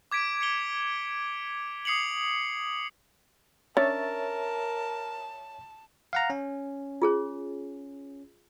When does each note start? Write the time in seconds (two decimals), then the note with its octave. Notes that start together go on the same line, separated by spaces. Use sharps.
0.12 D6 G#6 B6 D7
0.41 C#7 F7 G7
1.85 D#6 C7 C#7 F7 F#7
3.77 C#4 D4 A#4 C#5 E5 A5 A6
6.13 F5 F#5 A#5
6.30 C#4
7.02 F4 G#4 C#5